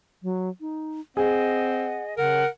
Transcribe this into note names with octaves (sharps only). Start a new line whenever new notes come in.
F#3
D#4
C4 G#4 D#5 F#5
C#3 A#4 F#5